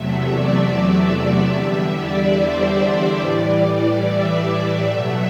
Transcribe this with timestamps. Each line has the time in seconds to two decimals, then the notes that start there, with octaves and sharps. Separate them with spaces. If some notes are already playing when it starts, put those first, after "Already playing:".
Already playing: E2 C3 F#3 A3 E5
0.29 D5
1.54 E2 D3 G3 E5
1.96 D5
2.37 C5
2.79 D5
3.21 A2 E3 G3
4.03 E5
4.45 E5
4.87 B2 F#3 A3